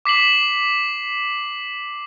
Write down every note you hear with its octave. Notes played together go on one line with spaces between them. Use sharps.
D6 B6 C7 F#7